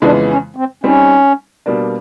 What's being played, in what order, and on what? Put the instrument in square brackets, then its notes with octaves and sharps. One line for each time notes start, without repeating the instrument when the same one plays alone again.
[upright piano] F2 C#3 E3 G#3 B3 [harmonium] D4
[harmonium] C#4
C4
[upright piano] G3 C4 D#4 [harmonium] C#4
[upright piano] B2 G3 A#3 D4